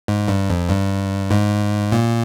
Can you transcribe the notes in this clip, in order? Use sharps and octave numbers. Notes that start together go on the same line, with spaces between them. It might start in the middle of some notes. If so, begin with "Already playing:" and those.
G#2
G2
F2
G2
G#2
A#2